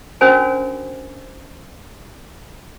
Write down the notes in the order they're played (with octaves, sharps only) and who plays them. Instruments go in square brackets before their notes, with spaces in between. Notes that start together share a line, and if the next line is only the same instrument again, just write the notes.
[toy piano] C#4 D4 F#4 A#4 C5 G#5